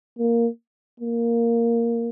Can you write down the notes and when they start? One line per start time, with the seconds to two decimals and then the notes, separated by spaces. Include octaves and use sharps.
0.19 A#3
1.00 A#3